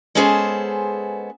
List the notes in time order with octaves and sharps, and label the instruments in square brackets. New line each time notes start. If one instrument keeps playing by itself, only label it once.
[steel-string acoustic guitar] G#3 B3 C#4 G#4 A4 C5